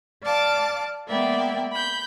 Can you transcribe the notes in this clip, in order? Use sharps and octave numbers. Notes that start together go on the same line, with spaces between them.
D5 F5 A5 D6
G#3 A#3 B3 D5 E5 G5
B5 G6